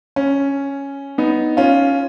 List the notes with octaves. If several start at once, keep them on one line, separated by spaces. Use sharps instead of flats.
C#4
B3 D#4
C#4 F4